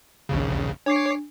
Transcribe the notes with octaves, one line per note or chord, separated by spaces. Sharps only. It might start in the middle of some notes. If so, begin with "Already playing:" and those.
A#1 D#2 C#3
D4 C#5 D6 C7